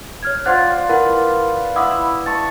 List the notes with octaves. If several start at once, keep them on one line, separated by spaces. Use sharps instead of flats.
C#5 F6 G#6
F4 C5 D5 F#5 F#6
E4 A#4 B4 F#5
E4 F#5 B5 D6 D#6
A5 C#6